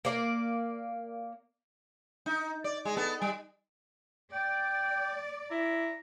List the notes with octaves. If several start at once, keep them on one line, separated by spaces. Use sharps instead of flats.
A#3 D5
D#4
D5
G#3
B3 A4
G3
D5 G5
E4 A#5